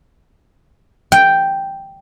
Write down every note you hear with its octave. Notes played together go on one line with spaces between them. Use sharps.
G5